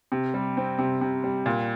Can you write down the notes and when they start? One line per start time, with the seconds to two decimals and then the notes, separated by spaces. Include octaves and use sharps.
0.12 C3
0.34 G3
0.57 C4
0.79 C3
1.01 C3
1.24 G3
1.46 A#2